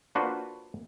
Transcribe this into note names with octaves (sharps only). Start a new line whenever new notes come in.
A#3 D4 F4 F#4 B4 C5